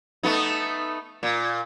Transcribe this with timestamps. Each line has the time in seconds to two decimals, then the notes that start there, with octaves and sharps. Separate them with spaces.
0.23 A3 B3 D#4
1.23 A#2